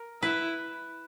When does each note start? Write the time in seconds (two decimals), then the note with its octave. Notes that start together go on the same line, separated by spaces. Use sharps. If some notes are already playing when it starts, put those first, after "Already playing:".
Already playing: A#4
0.23 E4 B4